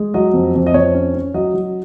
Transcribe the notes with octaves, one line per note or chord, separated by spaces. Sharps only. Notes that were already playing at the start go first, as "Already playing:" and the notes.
Already playing: G#3
F#3 D#5
F2
F2
D#5
F2 C#5
C#4
C#4
F#3 D#5
F#3